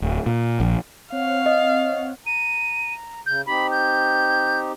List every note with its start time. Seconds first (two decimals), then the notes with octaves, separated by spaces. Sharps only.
0.02 D1
0.26 A#2
0.60 A#1
1.12 C4 C#5 F5 F#5
1.46 D#5
2.26 A#5 D#7
3.26 C#3 G6
3.46 C4 D#4 G4 B5
3.71 G6